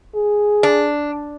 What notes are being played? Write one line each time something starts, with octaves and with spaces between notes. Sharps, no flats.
G#4
D4